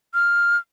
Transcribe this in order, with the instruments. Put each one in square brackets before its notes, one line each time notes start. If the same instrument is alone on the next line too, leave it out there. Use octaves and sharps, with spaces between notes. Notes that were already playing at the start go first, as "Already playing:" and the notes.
[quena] F6